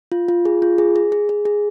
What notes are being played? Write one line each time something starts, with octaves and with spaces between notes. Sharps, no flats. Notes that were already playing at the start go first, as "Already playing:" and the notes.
F4
F4
G#4
F4
G#4
G#4
G#4
G#4
G#4